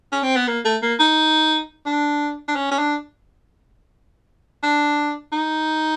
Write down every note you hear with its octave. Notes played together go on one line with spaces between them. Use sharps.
C#4
C4
B3
A#3
A3
A#3
D#4
D4
D4
C#4
C#4
D4
D4
D#4